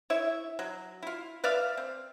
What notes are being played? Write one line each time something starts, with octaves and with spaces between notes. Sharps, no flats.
E4 C#5 E5
F#3
E4 F4
B4 D5 E5 F5
C4